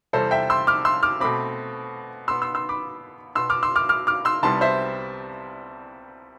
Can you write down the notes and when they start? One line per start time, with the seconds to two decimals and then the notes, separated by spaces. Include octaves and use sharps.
0.13 E2 C3 G3 C4 A4 C5
0.31 E5 G5
0.50 C6 E6
0.67 D6 F6
0.85 C6 E6
1.03 D6 F6
1.20 B2 A3 C4 B5 D6
2.28 B2 B3 C6 E6
2.42 C6 E6
2.55 C6 E6
2.69 B5 D6
3.35 B2 B3 C6 E6
3.50 D6 F6
3.63 C6 E6
3.76 D6 F6
3.89 D6 F6
4.07 D6 F6
4.25 C6 E6
4.43 C2 C3 G3 B3 A5 C6
4.61 C5 E5